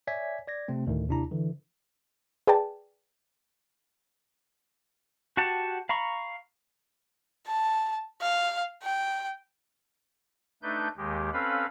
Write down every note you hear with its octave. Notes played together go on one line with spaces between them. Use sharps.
C#5 D5 E5 G#5 G#6 B6
D5 G#6 A#6
C3 A3 C4
D2 A2 D#3
D#2 C3 D4 E4 A#5
D3 E3
G#4 B4 D5 G5 A5
F#4 G4 F#5 A5
F5 A#5 B5 C#6
A5
F5
G5
A3 D4 D#4 B4 G6
D#2 D#3 G#3 G4
C4 C#4 A4 B4 F5 B5